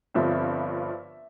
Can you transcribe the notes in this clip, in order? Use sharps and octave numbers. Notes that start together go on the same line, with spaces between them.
G1 G2 F3 C4 E5